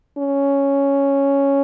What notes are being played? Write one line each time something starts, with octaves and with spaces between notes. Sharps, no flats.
C#4